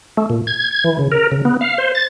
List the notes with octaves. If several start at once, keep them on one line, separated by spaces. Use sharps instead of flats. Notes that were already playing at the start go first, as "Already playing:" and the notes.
A3
A#2
G#6
G#6
E3
C#3
A#4
C#3
B3
F5
C5
A6